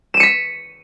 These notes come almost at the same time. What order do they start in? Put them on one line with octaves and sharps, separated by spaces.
E7 D#7 C#7 B6